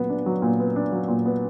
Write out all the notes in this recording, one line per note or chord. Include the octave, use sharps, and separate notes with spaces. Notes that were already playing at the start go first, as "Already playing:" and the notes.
Already playing: A#2 F#3 B3
D4
F#3
A#2
B3
D4
F#3
A#2
B3